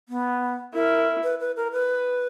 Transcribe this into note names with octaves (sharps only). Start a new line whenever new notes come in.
B3
E4 A#4
B4
B4
A#4
B4